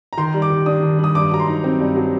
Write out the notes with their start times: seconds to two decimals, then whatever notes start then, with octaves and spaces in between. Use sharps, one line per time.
0.13 A#5
0.17 D#3 C6
0.34 G3
0.42 D6
0.50 D#3
0.66 D4 D#6
0.83 D#3
0.99 G3
1.04 D#6
1.15 G2 D6
1.31 F#3 A#5
1.40 C6
1.48 D#4
1.64 C4
1.80 G2
1.96 F#3